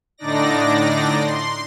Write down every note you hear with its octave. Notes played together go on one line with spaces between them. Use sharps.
A2 D3 D4 D#4 D5 A#6
C6